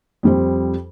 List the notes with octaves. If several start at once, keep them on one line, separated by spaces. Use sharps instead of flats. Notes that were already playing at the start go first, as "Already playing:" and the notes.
F2 G3 C5